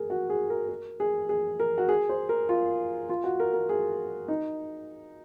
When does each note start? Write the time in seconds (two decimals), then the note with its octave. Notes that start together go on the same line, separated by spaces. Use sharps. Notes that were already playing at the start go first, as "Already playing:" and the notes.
Already playing: G#4 A#4
0.10 F#4
0.30 G#4
0.50 A#4
0.69 A#4
1.00 G#4
1.29 G#4
1.60 A#4
1.78 F#4
1.89 G#4
2.09 C5
2.29 A#4
2.49 F4
3.09 F4
3.24 F#4
3.40 A#4
3.54 A#4
3.69 G#4
4.28 D#4